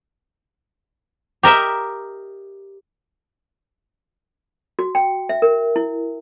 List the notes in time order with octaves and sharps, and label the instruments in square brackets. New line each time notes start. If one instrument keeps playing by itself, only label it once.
[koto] G4 A#4 D#5 E5
[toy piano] F#4
G5
E5
A#4
E4